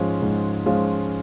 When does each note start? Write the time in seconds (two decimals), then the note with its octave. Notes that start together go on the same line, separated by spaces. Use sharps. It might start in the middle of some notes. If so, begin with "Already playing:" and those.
Already playing: G#2 F3 G#3 C#4 F4
0.22 G#2
0.66 F3 G#3 C#4 F4